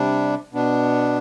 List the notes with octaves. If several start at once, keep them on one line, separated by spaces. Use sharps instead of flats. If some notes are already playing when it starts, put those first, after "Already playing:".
Already playing: C3 G3 D4
B2 B3 D4